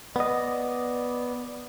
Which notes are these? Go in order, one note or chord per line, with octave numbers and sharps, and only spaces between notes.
B3 D5 D#5